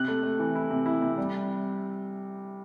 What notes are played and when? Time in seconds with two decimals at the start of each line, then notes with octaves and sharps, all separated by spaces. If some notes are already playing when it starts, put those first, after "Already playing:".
Already playing: C3 F#6
0.08 A3
0.23 A3
0.39 E3
0.55 E4
0.70 C3
0.86 E4
1.01 C3
1.17 G3